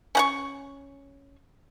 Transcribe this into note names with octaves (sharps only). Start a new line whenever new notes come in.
C#4 F#5 C#6